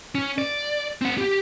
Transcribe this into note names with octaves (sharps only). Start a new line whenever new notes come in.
C#4
D5
C4 F#5
G4